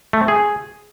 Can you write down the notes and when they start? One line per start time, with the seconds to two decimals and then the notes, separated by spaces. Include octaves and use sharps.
0.13 A3
0.21 C4
0.28 G#4